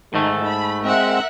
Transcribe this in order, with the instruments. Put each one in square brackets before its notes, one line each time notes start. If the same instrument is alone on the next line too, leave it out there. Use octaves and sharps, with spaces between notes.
[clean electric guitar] G#2 A3 [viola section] D#3
[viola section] B5
[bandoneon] G#3 C4 [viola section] A#4 E5 F#5